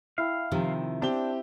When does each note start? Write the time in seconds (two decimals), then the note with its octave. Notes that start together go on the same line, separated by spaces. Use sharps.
0.18 E4 F5 G5
0.52 C3 D#3 F3
1.02 C4 D4 G4 G7